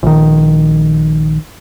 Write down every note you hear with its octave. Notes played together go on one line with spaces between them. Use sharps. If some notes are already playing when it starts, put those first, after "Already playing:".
A#1 D#3